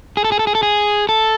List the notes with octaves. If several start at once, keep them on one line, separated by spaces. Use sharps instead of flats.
G#4
A4
G#4
A4
G#4
A4
G#4
A4